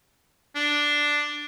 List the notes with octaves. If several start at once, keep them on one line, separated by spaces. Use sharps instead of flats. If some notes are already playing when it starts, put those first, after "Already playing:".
D4